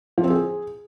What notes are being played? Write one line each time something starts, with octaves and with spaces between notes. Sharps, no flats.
F3
C4
G#4